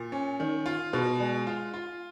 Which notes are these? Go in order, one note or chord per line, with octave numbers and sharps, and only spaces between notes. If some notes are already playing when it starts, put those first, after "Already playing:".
Already playing: A#2
C#4
D#3
F4
B2
G#3
F4
F4